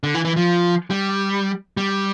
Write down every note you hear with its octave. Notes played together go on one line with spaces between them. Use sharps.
D3
E3
E3
F3
G3
G3